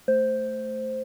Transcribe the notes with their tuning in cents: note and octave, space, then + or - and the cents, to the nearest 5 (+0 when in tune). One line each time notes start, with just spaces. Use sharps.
A3 +0 C5 +0